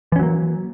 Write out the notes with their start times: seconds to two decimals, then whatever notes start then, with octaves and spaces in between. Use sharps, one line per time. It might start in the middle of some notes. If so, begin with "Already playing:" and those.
0.12 E3
0.16 C#4
0.19 F#3
0.23 A#3